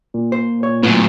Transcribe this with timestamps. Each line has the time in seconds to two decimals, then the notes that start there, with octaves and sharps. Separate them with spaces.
0.14 A#2
0.32 C5
0.63 C#5
0.83 A2 F#3 B3